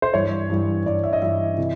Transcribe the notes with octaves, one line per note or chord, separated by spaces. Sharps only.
C5
G2 E3 G3 C#5
G2 E3 G3
G2 E3 G3 D5
E5
D#5
G2 E3 G3 E5
C3 E3